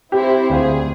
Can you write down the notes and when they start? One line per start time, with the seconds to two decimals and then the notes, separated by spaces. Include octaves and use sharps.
0.12 C4 E4 G4 C5
0.50 D2 G#4 C5 F5